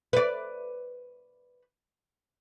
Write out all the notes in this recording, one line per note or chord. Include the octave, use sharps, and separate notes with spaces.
B4 D5